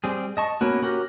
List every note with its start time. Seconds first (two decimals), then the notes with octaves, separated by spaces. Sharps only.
0.04 G3 C4 G#4
0.37 D#5 A5 C#6
0.61 A#3 B3 C#4 F#4
0.82 C#4 F#4 G4 A#4